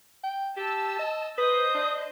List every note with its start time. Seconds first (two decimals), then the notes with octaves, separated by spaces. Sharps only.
0.24 G5
0.57 G4 A5 E6
0.99 D#5
1.38 B4 C5 D#5 D#6 G6
1.75 D4